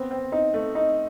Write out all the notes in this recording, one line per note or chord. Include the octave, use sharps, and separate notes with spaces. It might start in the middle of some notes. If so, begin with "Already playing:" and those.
Already playing: B3 C4
C4
D#4
A3
D#4